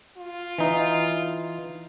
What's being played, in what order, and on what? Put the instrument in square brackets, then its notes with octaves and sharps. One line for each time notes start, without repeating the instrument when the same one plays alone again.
[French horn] F4
[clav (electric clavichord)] E3 D#4